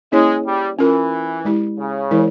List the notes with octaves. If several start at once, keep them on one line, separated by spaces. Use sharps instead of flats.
G#3 A#3 C#4 E4 G#4 C#5
G3
E3 C#4 F4 A#4
G#3 E4 G4
C#3
E3 G#3 E4 A#4 C#5